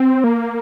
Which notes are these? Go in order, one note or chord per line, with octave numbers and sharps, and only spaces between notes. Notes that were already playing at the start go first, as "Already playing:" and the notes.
Already playing: C4
A#3